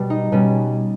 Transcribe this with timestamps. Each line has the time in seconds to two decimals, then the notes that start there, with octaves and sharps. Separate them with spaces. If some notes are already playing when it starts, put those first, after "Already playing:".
Already playing: B2 G3
0.10 D#4
0.32 B2 G3 C#4